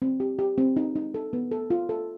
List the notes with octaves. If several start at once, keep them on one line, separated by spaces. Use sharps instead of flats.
C4
G4
G4
C4
D#4
D#4
A4
B3
A4
F4
A4